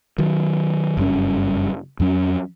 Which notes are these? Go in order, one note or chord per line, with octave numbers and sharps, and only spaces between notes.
D#3 F#3
F#1 G2 G3 C#4
F2 F#3 C#4